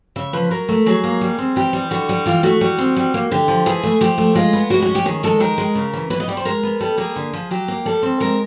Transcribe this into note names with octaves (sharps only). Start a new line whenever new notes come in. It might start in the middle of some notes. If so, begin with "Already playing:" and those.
C#3 E5
F3 B4
F#3 A#4
A3
F#3 G#4
A#3
G3
C4
E3 G4
G3
D3 F#4
G3
E3 F4
A3 F#4
G3
C4
G3
A#3
D3 G4
F3
E3 G#4
A3
F3 G4
A3
G#3 F4
B3
G#3 F#4
F#4
C#4
G4
D#3 G#4
G#3 A4
D#3 A#4
G#3
C#3
E3
B2 B4
D#5
G3 D5
C5
G#3 A#4
B3
G3 A4
A#3 G#4
D3
F3
F#3 G4
A#3
G3 A4
C4
G#3 A#4